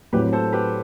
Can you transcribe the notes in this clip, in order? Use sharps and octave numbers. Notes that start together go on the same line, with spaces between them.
A2 F#3 C4 G4 B4
A4 C5
G4 B4